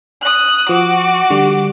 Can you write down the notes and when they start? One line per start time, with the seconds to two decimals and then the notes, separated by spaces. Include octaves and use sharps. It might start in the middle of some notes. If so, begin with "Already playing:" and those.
0.22 D#6 F#6
0.69 F3 F#4 D6
1.30 D3 G3